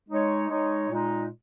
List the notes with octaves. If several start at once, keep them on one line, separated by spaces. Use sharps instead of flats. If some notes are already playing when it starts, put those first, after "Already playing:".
G#3 D#4 C#5
G#3 D#4 C#5
A#2 G#3 D#4